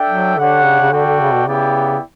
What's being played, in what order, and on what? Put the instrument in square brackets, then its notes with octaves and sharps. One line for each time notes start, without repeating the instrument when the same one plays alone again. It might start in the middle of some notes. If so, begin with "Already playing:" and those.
Already playing: [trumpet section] D4 A4 E5 G5
[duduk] F#3
[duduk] D3 [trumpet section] D4 G4 C#5 F#5
[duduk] C#3
C#3
[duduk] D3 [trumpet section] F#4 A4 D5 G5
[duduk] D3
C#3
B2
[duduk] C#3 [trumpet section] B3 E4 G4 D5 G5